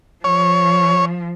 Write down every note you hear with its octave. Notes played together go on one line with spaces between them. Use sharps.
F3 C#5